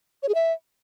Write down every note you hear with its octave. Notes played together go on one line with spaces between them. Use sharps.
C#5
G#4
E5